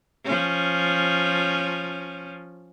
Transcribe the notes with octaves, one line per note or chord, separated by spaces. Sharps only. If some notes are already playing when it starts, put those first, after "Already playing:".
F3 C#4